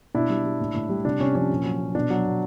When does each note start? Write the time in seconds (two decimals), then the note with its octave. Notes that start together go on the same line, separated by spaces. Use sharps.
0.14 B2 D4 E4
0.30 G3
0.44 G3
0.60 A2
0.74 A2
0.89 G3
1.05 C3 D4
1.20 C3 C#4
1.35 F3 C#4
1.50 A#2
1.65 F#3
1.80 F#3
1.95 B2 D4
2.10 F#3
2.25 B2